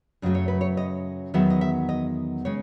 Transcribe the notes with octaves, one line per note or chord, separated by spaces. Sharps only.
F#2 C#3 F#3 A3 D#5
C#5
B4
C#5
D#5
E2 D#3 F#3 B3 E5
D#5
E5
D#5
C#3 G#3 C#5